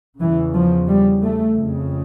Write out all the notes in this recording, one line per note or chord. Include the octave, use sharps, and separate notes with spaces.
E2 C#3 E3
F3
G3
A3
F2 C#3